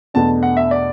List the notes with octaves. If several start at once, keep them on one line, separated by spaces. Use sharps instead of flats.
E2 B2 A3 D4 A5
F#5
E5
D5